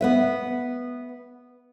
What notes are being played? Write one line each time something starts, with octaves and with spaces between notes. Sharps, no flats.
B3 B4 E5